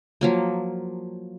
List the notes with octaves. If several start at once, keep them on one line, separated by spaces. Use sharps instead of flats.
F3 F#3 A#3